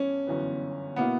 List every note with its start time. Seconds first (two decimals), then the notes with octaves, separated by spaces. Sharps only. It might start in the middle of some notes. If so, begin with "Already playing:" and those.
Already playing: G2 E3 B3 C#4 D4
0.27 G1 F#2 E3 B3
0.96 B2 A#3 B3 E4